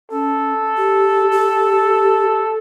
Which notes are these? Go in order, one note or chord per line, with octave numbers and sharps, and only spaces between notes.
C#4 A4
G4
G4